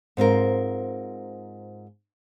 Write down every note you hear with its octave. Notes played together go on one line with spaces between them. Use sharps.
G#2 C4 F4 A#4